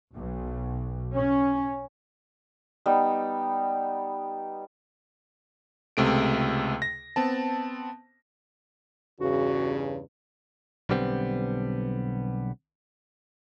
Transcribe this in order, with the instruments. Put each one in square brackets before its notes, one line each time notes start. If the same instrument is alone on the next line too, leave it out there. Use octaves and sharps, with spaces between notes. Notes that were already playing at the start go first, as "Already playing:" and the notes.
[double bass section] B1
C#4
[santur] G3 B3 D#4
[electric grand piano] C#2 C3 A3 D7
A#6
B3 C4 A5
[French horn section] E2 G2 C#3 [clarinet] F#4
[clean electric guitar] B1 D3 G3 B3 C4